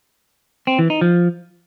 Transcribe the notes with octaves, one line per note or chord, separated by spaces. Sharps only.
C4
E3
D#4
F3